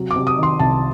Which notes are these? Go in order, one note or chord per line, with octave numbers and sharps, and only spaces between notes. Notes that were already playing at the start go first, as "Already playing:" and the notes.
Already playing: C3 F#3
D6
C3
D#6
D#3
C6
C2 A5